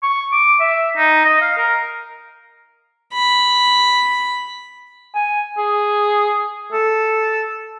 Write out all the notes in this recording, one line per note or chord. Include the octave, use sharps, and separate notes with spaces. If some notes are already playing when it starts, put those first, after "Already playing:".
C#6
D6
E5
D#4
D#5
F5
A#4
B5
G#5
G#4
A4